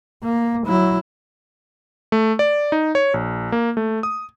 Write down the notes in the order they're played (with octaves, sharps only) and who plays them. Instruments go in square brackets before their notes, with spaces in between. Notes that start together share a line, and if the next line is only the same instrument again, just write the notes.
[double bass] A#3
F#3 E4
[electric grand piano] A3
D5
D#4
C#5
A#1
A#3
A3
D#6